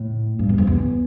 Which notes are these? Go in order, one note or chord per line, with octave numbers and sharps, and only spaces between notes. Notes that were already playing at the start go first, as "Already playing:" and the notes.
Already playing: A2
G2
E2
F2
E2